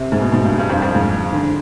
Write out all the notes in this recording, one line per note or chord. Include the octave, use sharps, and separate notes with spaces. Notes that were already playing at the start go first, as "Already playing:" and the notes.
Already playing: C3
G#2
B2
G#2
G2
G2
F2
F2
G#2
D3